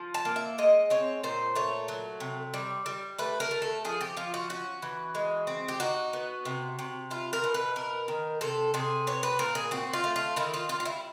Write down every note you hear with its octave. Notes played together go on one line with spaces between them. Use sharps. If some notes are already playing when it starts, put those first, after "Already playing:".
Already playing: F3
A5
A#3
E5
G#3 D#5
C4 C#5
A#2 C5
A3 C#5
F#3
C3
G3
G3
A3 B4
A#4
A3
A4
F3 G#4
G4
F3 F4
F#4
C#4 F#4
E3
G#3
C4
G4
D#4 F#4
B3
C3
C3
E4 F4
A#4
B2
B4
B3 A#4
D#3
C3 A4
C3 G#4
B3 C#5
B4
A#2 A#4
G#4
C4 F#4
F4
A3
F4
D#3 E4
F4
G3 F4
F4
E4